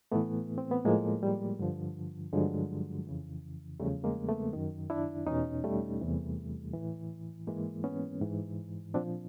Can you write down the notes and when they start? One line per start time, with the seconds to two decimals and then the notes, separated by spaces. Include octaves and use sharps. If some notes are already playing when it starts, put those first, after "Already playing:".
0.12 A2 E3 A3 B3
0.58 C4
0.71 B3
0.85 A2 F3 G#3 A#3
1.23 G3
1.59 G2 D3 F3
2.33 G2 D3 F3 F#3 G#3
3.07 F2 C#3 E3
3.80 E2 C#3 F3 G3 A3
4.04 G#3 A#3
4.28 A3 B3
4.53 F#2 D#3
4.90 D4 E4
5.27 E2 B2 C#4 D#4
5.64 G3 A3
6.01 E2 C3 E3
6.74 A2 E3
7.47 G#2 E3 G#3 A#3
7.84 B3 C#4
8.21 G#2 E3
8.94 A#2 F3 C4 D4